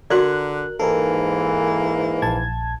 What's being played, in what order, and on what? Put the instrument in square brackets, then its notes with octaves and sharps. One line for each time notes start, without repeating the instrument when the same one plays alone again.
[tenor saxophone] D3 [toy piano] F#4 D5 [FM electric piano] A#4 F#6
[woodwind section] G#2 E3 [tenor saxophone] A#3 [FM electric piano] A4 A#4
[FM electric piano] A#1 A5 G#6